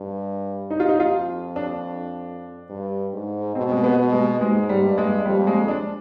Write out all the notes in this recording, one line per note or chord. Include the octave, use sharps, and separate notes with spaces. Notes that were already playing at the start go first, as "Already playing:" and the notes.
Already playing: G2
D#4
F4
D#4
F2 F4
D4
G2
G#2
B2 C4
G#3
B3
B2
G#3
G#2 G#3
G3
G2
G#3
F2 G3
G#3
D4